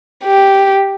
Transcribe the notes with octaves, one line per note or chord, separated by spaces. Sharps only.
G4